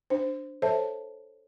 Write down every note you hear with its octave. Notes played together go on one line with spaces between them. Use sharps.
D4 C5
A4 C5 C#5 E5 A5